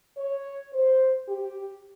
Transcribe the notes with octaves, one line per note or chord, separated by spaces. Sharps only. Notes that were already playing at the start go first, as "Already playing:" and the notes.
C#5
C5
G4